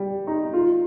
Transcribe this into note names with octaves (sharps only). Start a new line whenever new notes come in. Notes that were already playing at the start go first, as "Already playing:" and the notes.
Already playing: G3
D#4
F4